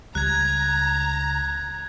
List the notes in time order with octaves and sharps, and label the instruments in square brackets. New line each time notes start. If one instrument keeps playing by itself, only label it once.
[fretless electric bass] C#2 G3 [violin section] A#5 [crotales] F#6 G#6